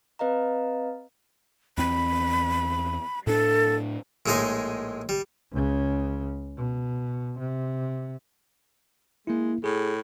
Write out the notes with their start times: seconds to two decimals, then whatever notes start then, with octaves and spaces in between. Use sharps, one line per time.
0.19 C4 B4 D#5 F5 A#5
1.78 E2 C4 B5
3.27 A2 D4 A4
4.26 A#1 A2 G#3 D#4 D#5 G#5
5.09 G3
5.52 C#2 C#3
6.57 B2
7.39 C3
9.27 G#3 A#3 E4
9.64 A2 G#4